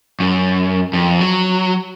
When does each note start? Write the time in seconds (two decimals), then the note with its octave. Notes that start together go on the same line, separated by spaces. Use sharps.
0.20 F#2
0.93 F2
1.20 F#3